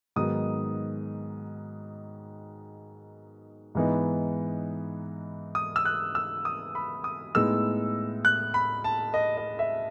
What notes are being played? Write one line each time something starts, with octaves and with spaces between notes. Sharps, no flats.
G#2 D#3 F#3 B3 D#4 D#6
G#2 E3 B3 D#4
D#6
E6
F#6
E6
D#6
B5
D#6
A2 G#3 B3 D#4 E6
F#6
B5
A5
D#5
D#5
E5